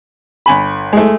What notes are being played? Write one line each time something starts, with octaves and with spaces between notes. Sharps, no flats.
G1 G#5 B5
G#3 A3